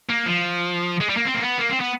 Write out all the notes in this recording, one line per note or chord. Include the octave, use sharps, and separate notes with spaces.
A#3
F3
G#3
G3
A#3
C4
A#3
B3
A#3
C4
B3